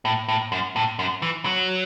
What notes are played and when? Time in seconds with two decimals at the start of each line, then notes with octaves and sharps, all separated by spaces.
0.05 A2
0.28 A2
0.52 F#2
0.76 A2
0.99 F#2
1.22 E3
1.45 F#3